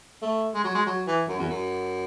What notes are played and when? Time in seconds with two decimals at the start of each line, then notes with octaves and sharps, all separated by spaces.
0.22 A3
0.54 G#3
0.64 F#3
0.75 G#3
0.86 F#3
1.07 E3
1.28 F#2
1.39 E2
1.49 F#2